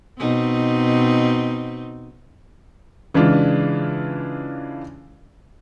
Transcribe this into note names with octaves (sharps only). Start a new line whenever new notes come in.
B2 C4 D#4
C#3 E3 G#3 D4 F4